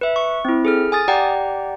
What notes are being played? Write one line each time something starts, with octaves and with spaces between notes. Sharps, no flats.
B4 E5
C#6
C4 E4
G#4 A4 F6
G#5 D#6 A6
G4 D5 F#5 G5 A#5